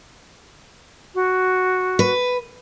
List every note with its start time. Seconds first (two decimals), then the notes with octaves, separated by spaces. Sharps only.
1.14 F#4
1.99 B4